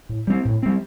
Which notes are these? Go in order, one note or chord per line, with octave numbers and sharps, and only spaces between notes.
A2
G3 C4
A2
G3 C4